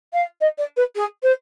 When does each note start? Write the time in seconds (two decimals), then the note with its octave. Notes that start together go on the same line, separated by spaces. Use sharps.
0.13 F5
0.41 D#5
0.58 D5
0.77 B4
0.96 G#4
1.23 C5